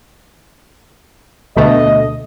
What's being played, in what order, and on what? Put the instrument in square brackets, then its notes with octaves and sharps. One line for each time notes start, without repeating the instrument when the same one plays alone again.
[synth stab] D2 B2 A3 [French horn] D#5